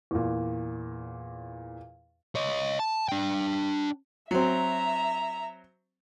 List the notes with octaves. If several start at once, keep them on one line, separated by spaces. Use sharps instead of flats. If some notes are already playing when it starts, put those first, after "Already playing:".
E2 A#2
C#5 D#5
A5
D4 G5
F#3 C4 E5 A#5